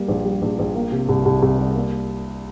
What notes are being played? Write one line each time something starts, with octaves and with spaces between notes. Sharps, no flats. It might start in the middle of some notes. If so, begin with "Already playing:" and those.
Already playing: G3 A#3
A#1
G3
A#1
A#1
A#3
C3
C2
C2
C2
G3
A#3